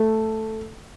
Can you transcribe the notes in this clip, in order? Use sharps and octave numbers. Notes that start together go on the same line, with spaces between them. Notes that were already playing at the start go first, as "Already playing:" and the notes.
Already playing: A3